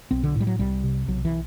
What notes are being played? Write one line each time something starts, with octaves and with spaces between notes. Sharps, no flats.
B1 C4
D3
A2
G3
F#3
C2 G3
C3
B1 F#3
E3